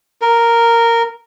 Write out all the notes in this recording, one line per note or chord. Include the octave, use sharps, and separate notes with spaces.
A#4